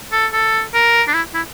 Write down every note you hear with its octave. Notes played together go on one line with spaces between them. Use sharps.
A4
A4
A#4
D4
E4
E4